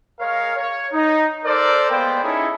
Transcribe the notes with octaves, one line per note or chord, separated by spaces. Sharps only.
G#3 A#4 C#5 F5
C#5
D#4
A4 A#4 C5 D5
G#3 A#3 B3 C5 D5 G5
C#4 D#4 E4 G#4 A4 C#5